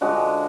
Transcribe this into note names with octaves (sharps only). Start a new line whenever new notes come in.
D3 F3 G#3 F#4